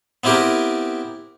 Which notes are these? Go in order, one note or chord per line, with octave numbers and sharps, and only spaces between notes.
B3 C4 E4 G4 A#4